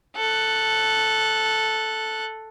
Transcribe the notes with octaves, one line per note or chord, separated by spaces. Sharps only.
A4 F#6